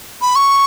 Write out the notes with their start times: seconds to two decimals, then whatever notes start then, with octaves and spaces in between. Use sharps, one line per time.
0.21 B5
0.36 C#6